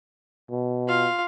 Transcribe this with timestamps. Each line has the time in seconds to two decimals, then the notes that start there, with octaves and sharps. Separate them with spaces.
0.51 B2
0.87 F4 F5